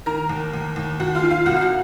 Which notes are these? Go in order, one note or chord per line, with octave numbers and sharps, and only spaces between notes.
D#3 A#4 A#5
D#2
D#2
D#2
D#2 F#4 F#5
F4 F5
D#3
F4 F5
C2 F#4 F#5
F5
F#4 F#5